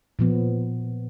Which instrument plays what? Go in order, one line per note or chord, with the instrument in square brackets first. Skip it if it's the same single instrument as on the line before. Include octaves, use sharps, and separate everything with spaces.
[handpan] A#2 F3 B3